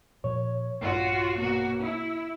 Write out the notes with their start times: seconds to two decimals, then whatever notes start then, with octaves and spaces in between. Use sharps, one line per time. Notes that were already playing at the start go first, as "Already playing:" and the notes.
0.24 A#2 F3 C#5
0.81 A#1 G2 F4 F#4
1.37 B2 A#3 F#4
1.84 E4